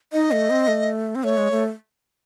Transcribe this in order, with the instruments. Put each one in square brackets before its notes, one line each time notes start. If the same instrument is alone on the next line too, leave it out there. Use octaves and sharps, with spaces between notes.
[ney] D#4 [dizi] D#5
[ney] A3
C4
A3
C4
[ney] A3 [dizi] C#5
[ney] G#3
A3